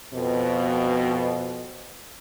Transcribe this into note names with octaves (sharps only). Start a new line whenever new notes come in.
F2 B2